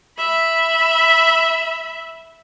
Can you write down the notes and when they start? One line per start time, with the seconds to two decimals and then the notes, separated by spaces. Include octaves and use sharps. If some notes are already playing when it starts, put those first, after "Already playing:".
0.18 E5 B5